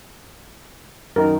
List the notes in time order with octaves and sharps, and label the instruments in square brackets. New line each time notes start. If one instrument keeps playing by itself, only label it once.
[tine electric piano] F#2 D#3 [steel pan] A#4